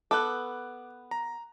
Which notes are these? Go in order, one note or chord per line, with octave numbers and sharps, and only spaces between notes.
B3 A4 D6 F#6
A#5